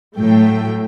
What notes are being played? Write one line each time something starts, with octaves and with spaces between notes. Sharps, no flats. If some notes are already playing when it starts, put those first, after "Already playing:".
A2 F#3 A3 G5